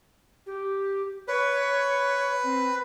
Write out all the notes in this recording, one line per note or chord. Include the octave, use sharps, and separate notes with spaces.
G4
B4 C#5
C4